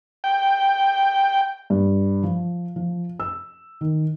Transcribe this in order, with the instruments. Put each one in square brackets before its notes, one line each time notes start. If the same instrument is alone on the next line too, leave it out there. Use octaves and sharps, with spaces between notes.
[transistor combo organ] G5
[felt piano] G2
F3
F3
E6
D#3